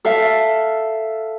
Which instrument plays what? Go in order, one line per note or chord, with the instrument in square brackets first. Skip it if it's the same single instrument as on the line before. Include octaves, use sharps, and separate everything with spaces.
[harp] A4 E5 F5